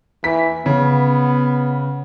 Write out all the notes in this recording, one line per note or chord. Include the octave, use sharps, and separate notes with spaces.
E3 B6
C#3 B3